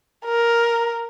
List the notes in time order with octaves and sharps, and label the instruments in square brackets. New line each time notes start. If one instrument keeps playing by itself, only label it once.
[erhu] A#4